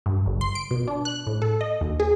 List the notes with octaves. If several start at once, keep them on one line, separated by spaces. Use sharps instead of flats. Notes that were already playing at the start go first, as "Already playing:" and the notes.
G2
G1
C6
D7
B2
D4
F#6
A2
A4
D#5
D#2
G#4